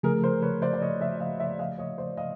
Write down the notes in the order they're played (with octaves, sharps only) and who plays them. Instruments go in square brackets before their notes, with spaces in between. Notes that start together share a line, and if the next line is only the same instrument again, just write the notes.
[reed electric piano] C#3 F3 A3 [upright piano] G#4 A#4
[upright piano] A#4 C5
B4 C#5
C5 D5
D5
C#5 D#5
D5 E5
D#5 F5
D5 E5
D#5 F5
C#5 D#5
C5 D5
D#5 F5